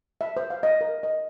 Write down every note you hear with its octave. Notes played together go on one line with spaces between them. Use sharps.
E5
C5
F5
D#5
A#4
D#5